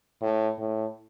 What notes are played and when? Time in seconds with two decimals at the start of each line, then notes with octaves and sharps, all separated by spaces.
0.21 A2
0.59 A2